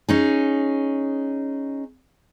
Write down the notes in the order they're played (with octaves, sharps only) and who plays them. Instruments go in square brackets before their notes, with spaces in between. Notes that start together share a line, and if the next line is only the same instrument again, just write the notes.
[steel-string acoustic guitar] C#4 D#4 G#4